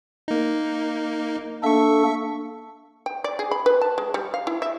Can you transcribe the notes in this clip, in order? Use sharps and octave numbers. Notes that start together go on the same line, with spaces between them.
A#3 D#4
A#3 D4 A4 E5 C#6
G5
D5
G#4
B5
B4
A5
G#3
G3
F5
E4
E5